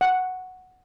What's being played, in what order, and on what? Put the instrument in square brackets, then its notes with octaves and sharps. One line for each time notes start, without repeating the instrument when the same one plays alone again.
[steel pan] F#5